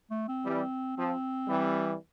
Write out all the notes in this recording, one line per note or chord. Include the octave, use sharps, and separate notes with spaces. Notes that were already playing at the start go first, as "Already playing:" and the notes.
A3
C4
E3 G3
F3 C4
E3 G3